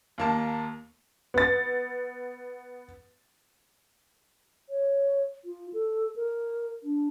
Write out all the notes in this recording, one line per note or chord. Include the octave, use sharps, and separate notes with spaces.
D#2 A#3 A5
B3 A6
C#5
F4
A4
A#4
D4